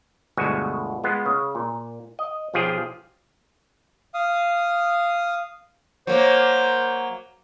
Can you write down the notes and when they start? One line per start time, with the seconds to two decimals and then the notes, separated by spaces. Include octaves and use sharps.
0.37 G1 D2 B2 G#3 F#4 G#5
1.04 G#3 B3 F4
1.26 C#3
1.55 A#2
2.19 D#5
2.54 B1 F3 F4 G4 G#4
4.14 F5 D#6
6.07 F#3 A#3 C5